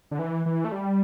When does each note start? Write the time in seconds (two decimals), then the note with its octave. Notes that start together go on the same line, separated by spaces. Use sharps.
0.11 D3
0.19 E3
0.46 E3
0.65 A3
0.72 G3